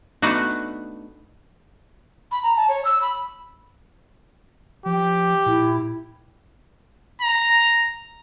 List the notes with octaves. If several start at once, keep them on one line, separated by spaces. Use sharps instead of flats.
A3 B3 D4 D#4 F#4
B5
A#5
A5
C#5
E6
B5
F3 G4
A#2 E4
A#5